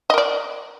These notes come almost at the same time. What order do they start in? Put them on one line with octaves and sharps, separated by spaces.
D#5 A#4 D5